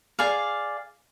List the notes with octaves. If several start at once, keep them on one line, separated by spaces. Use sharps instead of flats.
G#4 D5 F5